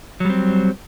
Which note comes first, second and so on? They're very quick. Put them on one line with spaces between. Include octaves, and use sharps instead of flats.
F#3 G3 C4